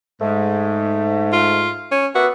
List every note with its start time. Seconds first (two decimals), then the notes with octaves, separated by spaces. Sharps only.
0.21 G#2 A3
1.33 F4
1.92 C#4
2.15 B3 F#4 A#4 D5 E5